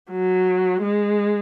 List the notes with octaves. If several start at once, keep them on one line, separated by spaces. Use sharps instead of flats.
F#3
G#3